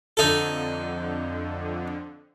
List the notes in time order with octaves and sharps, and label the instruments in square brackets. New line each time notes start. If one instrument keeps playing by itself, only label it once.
[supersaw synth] F2 D3 [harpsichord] D#4 A4